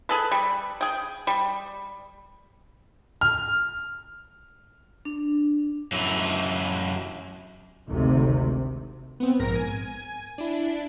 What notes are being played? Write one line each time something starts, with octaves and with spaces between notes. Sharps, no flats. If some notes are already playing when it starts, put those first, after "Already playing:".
G#4 A4 B4
G3
G#4 G5
G3
F6
D4
F#2 E3
G#1 D2 C3 D#3
B3 C4
A#1 G#2 A#4 A#6
G#5
D4 E4